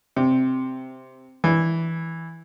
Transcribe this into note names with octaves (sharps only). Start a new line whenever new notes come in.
C3
E3